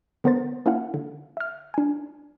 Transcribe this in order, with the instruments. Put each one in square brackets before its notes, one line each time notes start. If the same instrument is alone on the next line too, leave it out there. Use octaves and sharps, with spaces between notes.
[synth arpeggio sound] D3 B3 A#4 C5 A6
A#3 C#4 E4 F5 F#5
D3
E5 F6
D4 G#5